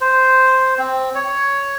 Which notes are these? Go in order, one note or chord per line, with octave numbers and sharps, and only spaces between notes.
C5
C4
C#5